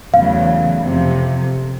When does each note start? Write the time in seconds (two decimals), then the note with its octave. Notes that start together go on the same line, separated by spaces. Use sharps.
0.14 E2 C#3 F#3 A3 F5
0.82 F2 C3 F3